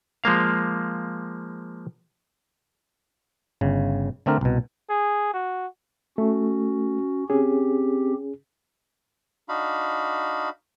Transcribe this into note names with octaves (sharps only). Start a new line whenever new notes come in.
F3 G#3 A#3 F5
G1 C#3
D3 A3 C4 D4 A#4
C2 B2
G#4
F#4
A3 C#4 F#4
C4 C#4 G4 G#4
D4 D#4 F#4 F5 B5